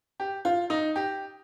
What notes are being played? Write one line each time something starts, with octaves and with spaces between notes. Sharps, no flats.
G4
F4
D#4
G4